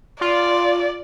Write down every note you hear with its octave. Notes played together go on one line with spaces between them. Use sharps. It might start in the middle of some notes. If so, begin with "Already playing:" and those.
F4 D5